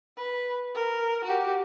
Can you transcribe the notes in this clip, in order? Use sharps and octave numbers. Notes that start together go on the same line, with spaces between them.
B4
A#4
F#4 G4